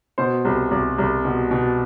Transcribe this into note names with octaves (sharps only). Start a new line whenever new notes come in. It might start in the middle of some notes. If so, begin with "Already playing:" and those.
B2 C5
C2
C2
C2
B2
B2